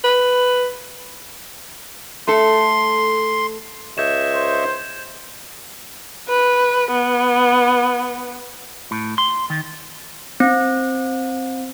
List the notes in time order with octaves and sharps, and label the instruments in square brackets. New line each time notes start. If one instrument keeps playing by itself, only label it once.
[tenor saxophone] B4
[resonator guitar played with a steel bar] A3 A4 [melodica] C6
[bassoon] C#2 [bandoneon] D#5 E5 C#6 [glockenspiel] G6 G#6 E7
[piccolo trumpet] C5
[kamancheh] B4
B3
[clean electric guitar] A2
C6
D#3
[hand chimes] C4